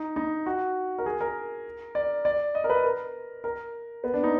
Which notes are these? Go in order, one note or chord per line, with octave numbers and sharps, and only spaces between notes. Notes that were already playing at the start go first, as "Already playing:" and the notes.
Already playing: D#4
D#4
F#4
A#4
G#4
A#4
D5
D5
D#5
A#4
B4
A#4
A#4
B3
D4
D#4